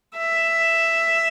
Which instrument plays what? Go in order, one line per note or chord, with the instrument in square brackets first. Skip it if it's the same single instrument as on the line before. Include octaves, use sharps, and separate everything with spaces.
[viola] E5